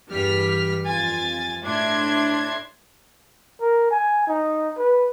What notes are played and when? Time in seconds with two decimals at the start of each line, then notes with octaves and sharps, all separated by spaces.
0.10 E2 G2 G3 F6 B6
0.85 F2 F4 G#5 A6
1.63 A2 D4 E5 C6 G#6
3.61 A#4
3.91 G#5
4.28 D#4
4.78 B4